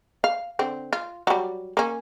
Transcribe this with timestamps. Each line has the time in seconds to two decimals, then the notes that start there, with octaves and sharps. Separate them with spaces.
0.24 F5
0.59 D3 C4
0.93 F4
1.27 F#3 G3
1.77 A#3 C#4